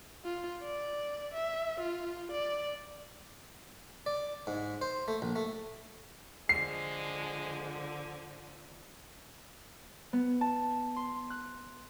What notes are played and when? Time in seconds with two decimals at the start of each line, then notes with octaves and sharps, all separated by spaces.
0.25 F4
0.63 D5
1.34 E5
1.80 F4
2.32 D5
4.06 D5
4.47 G#2
4.81 C5
5.08 A3
5.22 A#1
5.36 A3
6.49 D3 F3 G#3 C7
10.13 B3
10.41 A5
10.96 C6
11.30 F#6